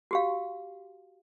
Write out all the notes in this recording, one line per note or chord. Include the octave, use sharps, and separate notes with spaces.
F#4 G4 F5